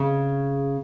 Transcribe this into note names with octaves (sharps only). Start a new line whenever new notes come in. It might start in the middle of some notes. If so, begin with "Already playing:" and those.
Already playing: C#3